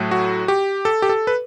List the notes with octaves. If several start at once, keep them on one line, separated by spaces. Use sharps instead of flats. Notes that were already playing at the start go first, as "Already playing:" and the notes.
Already playing: A2 F#3 A3
F#4
G4
A4
G4
A4
B4